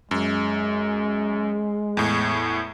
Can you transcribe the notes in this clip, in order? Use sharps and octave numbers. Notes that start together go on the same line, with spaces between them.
F#2 G#3
E2 A2